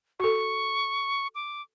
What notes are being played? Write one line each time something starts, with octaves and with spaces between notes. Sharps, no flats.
F#4 A4 C#6
D6